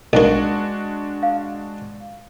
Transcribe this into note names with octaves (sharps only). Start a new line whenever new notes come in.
B1 G#3 A#3 D4 F#4
F5